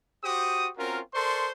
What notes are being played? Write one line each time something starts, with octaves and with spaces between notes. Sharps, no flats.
F#4 G4 C5 D#6
C4 C#4 F4 F#4 A#4
A4 A#4 C5 D5 C6 C#6